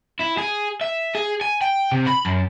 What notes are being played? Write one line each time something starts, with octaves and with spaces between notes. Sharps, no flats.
E4
G#4
E5
G#4
G#5
G5
C3
B5
F#2